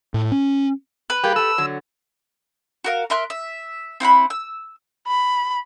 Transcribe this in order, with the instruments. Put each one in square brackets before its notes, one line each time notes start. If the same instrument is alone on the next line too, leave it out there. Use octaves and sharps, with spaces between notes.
[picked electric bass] A2
C#4
[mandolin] B4
[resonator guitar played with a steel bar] G3 A#3 G#4 [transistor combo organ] G4
[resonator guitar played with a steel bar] G4 A4 [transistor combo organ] E6
[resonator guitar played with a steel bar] D3 F#3
[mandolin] F#4 A#4 F5
A#4 E5 C6 F#6
E5
C4 E4 F#5 B5
E6
[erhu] B5